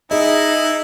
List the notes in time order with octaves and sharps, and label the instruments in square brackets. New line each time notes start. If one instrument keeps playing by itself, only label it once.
[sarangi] D#4 [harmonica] E4 [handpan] G#4 D#5